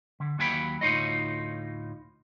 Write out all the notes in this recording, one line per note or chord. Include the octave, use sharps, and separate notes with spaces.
D3
D#2 F#3 A#3 G5 G#5 B5
D2 A2 D#4 F4 C#5 D#5